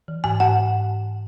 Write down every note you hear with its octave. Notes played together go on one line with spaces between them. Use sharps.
E3
G#2 G#5
G#2 F#5